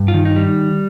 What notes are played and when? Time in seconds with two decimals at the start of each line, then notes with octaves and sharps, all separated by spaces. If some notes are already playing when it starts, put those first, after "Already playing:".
Already playing: G2
0.08 F4
0.14 D#3
0.25 D#4
0.36 G3